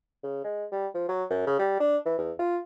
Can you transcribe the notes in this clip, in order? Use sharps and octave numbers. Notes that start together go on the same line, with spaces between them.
C#3
G#3
G3
F3
F#3
F#2
C#3
G3
D4
E3
E2
F4